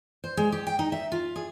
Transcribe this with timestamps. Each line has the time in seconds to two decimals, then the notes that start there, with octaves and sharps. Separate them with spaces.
0.24 C5
0.37 G#3
0.52 G4
0.67 G5
0.79 D#4
0.92 E5
1.12 F4
1.36 G#4